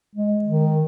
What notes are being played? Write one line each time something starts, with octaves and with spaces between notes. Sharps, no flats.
G#3
D#3